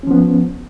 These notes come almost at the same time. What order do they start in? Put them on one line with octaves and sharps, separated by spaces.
C#4 F3 B3